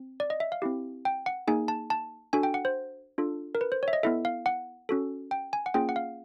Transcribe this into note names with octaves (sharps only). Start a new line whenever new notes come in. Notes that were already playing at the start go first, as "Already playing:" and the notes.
Already playing: C4
D5
D#5
E5
F5
C4 E4 G4
G5
F#5
A#3 D#4 G#4 G#5
A5
A5
D4 F#4 A4 G#5
G5
F#5
C5
D4 F4 A4
A#4
B4
C5
C#5 E5
D#5
B3 E4 A4 E5
F5
F#5
C#4 F#4 A4
G5
G#5
F#5
A#3 C#4 F4 G#4 G5
F#5
F5